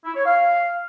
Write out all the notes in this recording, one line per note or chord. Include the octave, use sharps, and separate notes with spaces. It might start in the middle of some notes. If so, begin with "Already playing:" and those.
E4
C#5
F5